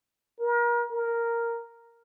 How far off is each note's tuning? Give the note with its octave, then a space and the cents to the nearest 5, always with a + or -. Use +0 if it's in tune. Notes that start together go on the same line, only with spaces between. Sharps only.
A#4 +35
A#4 +0